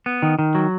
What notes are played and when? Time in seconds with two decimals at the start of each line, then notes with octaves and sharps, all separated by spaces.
0.06 B3
0.22 D#3
0.39 D#3
0.55 F#3